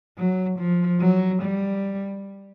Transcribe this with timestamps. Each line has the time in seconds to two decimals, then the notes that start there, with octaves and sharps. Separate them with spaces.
0.17 F#3
0.58 F3
1.00 F#3
1.41 G3